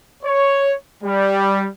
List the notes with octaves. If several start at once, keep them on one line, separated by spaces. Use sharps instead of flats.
C#5
G3